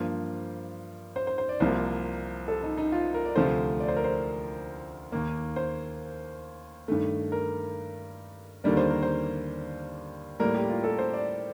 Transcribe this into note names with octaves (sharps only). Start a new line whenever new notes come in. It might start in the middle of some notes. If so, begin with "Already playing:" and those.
Already playing: G2 F3 A#3 C5
C5
C5
C5
D5
C2 C3 F3 A#3 C5
A4
D#4
D#4
F4
A#4
D5
D2 C3 F3 A3 C5
D5
C5
A#4
C5
D#2 D#3 A#3
C5
G2 D#3 A3
A#4
D#2 D3 G3 A#3 D5
C5
A#4
C5
A2 G3 A#3 A#4
G4
F4
A4
C5
D5